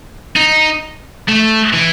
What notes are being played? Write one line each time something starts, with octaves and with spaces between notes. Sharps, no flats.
D#4
A3
E3